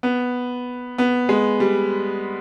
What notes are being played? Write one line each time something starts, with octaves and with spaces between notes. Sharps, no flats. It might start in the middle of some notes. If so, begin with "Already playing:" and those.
B3
B3
G#3
G3